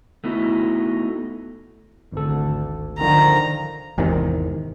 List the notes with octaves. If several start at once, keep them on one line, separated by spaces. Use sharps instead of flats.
A3 B3 D#4 E4 F#4
G#1 D2 A4
D3 D#3 F3 A#5
G#1 E2 C3 D#3